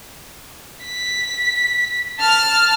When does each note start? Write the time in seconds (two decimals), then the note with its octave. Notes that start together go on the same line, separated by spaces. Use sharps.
0.84 B6
2.20 A5 F6